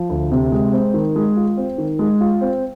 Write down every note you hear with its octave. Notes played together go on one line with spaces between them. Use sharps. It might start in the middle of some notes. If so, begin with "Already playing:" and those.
Already playing: F3
D2
C3
G#3
C4
D#3
G#3
F4
C4
D#3
G#3
F4
C4